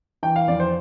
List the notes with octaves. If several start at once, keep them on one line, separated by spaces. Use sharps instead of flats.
E3 G5
F5
F2 D5
C5